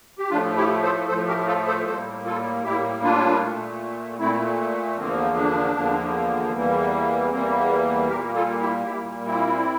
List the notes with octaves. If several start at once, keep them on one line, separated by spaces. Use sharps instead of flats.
G4
A2 F3 A3 D4 F4
E4 G4
A4 C5
A2 F3 A3 A4 C5
G4 A#4
F4 A4
A4 C5
A2 G3 A#3 A4 C5
F4 A4
A2 G3 A#3 E4 G4
D4 F4
A#2 A3
A#2 A3 C4 E4
E2 D3 F3 A#3 C4
D4
E2 D3 F3 A#3
E2 E3 G3 A#3
E2 E3 G3 A#3 C4
A#2 G3 A#3 G4 A#4
F4 A4
E4 G4
A#2 G3 A#3 E4 G4
C4 E4